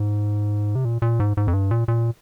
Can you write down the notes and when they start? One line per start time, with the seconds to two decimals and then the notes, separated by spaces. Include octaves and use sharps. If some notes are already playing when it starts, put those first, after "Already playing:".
Already playing: G#2
0.75 C3
0.85 A#2
1.02 A#2
1.20 G#2
1.37 G#2
1.48 F2
1.53 G2
1.71 A#2
1.88 A#2